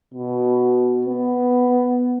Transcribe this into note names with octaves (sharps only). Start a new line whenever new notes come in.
B2
B3